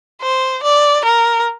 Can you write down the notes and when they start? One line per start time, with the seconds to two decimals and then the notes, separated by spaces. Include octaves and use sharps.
0.22 C5
0.63 D5
1.05 A#4